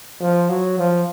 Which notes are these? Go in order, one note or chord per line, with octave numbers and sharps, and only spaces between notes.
F3
F#3
F3